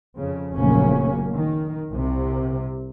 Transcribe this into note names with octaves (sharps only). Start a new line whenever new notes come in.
F2 C#3
F1 A#1 C#3 F#3 A#3 C#4
D#3
C2 C3